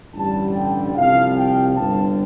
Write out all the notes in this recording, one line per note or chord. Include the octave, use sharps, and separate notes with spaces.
A1 G2 D3 G3 A5
G5
C2 C3 F3 F5
G5
G1 G2 D3 A5